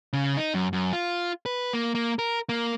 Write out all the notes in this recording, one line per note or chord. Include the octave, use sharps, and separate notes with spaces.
C#3
D#4
F#2
F#2
F4
B4
A#3
A#3
A#4
A#3